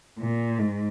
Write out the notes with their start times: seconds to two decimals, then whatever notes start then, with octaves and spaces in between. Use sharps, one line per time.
0.19 A#2
0.59 G#2